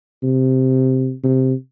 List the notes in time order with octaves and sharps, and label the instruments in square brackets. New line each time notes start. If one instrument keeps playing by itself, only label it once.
[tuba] C3
C3